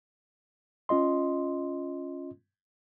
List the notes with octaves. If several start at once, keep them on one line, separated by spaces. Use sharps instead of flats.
C#4 F4 D#5 C6